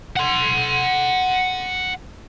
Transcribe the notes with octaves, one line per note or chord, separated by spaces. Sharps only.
F#5 C6